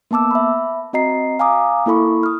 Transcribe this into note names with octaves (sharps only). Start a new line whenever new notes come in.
A#3 B3 A5 D6 E6
E5 B5
C4 F#4 D#5 A#5 C7
F5 G#5 A#5 D6 D#6
A#3 E4 A4 B5 C#6
D#6 F6